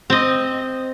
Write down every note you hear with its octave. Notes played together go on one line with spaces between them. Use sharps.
C4 D#5